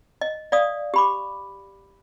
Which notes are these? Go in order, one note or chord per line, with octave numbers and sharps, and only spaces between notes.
D#5
D5 F5 D#6
G4 B5 D6